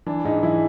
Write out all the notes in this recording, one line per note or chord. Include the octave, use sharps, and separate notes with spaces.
E3 D4
G#2 D#4
E3 E4